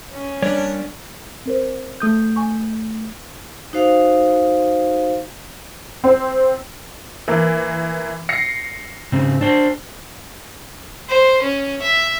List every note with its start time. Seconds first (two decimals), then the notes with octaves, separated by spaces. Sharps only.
0.13 C#4
0.42 G3 A#3 D4 C#5
1.45 C4 A#4 C5
2.00 A3 D#6 G6
2.36 G#5 C#6
3.73 D#4 F#4 C5 F5
6.04 C4
7.28 E3 A#3
8.29 A#6 C7 C#7
9.12 G#2 C#3 C4
9.41 D4 C5
11.08 C5
11.42 C#4
11.82 E5